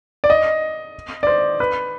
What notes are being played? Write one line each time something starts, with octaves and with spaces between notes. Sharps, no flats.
D5
D#5
D5
C5
B4